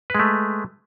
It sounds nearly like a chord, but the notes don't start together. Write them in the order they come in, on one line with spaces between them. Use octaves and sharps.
B4 G#3 A3